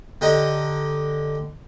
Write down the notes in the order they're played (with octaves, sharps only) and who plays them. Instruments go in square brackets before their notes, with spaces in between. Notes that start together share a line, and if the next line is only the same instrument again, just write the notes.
[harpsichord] D3 G4 D#5 A#5